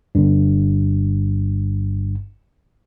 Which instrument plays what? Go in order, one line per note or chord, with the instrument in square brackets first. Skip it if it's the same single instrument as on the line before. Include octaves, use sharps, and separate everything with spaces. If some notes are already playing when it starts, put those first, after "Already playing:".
[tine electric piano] G1 G2